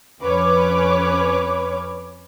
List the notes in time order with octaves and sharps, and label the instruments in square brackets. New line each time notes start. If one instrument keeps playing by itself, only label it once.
[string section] F2 C#4 B4 C#5 D6